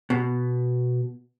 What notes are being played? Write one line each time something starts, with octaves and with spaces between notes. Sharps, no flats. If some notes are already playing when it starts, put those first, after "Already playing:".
B2